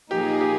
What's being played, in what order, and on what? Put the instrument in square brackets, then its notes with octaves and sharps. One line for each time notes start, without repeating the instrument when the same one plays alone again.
[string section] A#2 F3 A#3 D#4 G#4 [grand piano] G4
[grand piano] G4